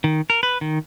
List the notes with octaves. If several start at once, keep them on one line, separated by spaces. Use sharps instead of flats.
D#3
A#4
B4
D#3